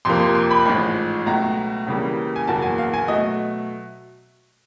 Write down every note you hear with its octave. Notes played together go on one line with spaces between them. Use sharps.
F2 C3 F3 A#3 C6
C6
C6
B5
A1 G#2 F3 G#3
C#2 B2 F#3 A3 A#5
C#2 C#3 E3 G3 A#3
G#5
F#1 E2 B2 F#3 A#3 A5
G#5
F5
G#5
B2 F#3 A3 D#5